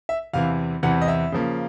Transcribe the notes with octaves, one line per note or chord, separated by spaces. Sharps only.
E5
E2 C3 E3 F5
E2 C3 E3 F#5
D#5
E5
C#3 F3 A#3